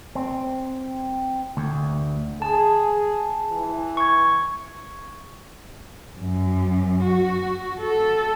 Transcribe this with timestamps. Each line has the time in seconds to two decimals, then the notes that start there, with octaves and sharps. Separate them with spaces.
0.15 C4
1.57 D2
2.42 G#4 A5
3.51 E3
3.97 C#6 G#6
6.19 F#2
7.04 F#4
7.80 A4